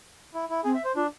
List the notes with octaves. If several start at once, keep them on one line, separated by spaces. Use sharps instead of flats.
E4
E4
C4 G#4
E5
C5
D4 F4